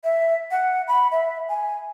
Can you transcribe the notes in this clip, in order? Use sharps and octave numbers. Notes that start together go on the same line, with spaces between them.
E5
F#5
B5
E5
G#5